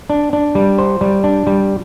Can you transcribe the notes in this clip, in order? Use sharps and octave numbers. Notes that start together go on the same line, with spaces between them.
D4
D4
G3
C5
G3
D4
G3